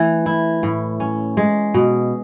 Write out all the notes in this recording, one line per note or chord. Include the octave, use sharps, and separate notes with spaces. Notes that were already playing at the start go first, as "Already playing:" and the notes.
Already playing: E3 A3
E4
A2
C#4
G#3
B2